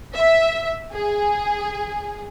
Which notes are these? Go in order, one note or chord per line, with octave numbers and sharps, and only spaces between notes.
E5
G#4